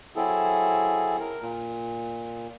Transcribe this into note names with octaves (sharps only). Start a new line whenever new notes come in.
F#3 C4 E4 G#4 A4
A#4
A#2